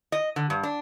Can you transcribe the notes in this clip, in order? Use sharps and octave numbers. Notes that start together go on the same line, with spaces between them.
D#5
D3
G2
D4